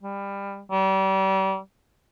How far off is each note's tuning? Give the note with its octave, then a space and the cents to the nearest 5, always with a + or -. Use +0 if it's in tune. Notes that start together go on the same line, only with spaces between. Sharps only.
G3 +20
G3 -35